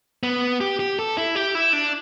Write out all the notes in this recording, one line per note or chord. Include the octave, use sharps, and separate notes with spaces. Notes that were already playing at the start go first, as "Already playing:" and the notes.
B3
G4
G4
A4
E4
G4
E4
D4